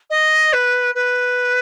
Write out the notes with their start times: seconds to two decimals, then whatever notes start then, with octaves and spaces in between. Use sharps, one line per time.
0.10 D#5
0.53 B4
0.95 B4